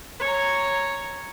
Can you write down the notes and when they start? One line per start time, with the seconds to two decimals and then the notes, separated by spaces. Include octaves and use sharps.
0.20 C#5 A#5